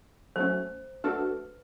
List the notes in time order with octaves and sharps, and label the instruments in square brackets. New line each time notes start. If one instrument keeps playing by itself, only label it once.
[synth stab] F#3 A3 C#4 [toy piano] C5
[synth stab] A3 D4 F#4 A4 [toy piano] B4